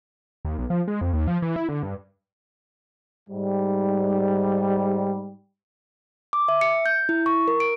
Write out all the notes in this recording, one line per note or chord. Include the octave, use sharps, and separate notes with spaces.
D#2
B1
F3
G#3
F2
D#2
F3
E3
E4
D3
G2
G#2 G3
D6
E5
C#7
G6
E4
C#6
A#4
D7